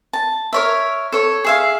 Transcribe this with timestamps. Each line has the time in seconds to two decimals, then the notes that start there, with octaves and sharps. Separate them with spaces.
0.13 A5
0.53 A#4 C#5 E5
1.12 A4 C#5
1.45 G#4 E5 F5